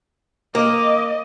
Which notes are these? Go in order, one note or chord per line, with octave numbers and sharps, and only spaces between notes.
A#3 D#5 D6